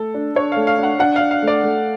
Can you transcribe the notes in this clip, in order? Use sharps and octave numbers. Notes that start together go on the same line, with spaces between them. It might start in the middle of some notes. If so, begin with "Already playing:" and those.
Already playing: A3 A4
D4
D4 C#5
A3 F5
F5
D4 F#5
D4 F#5
D4 F5
F5
A3
D5
A3